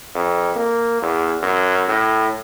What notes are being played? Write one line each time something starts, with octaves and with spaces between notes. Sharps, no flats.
F2
A#3
E2
F#2
A2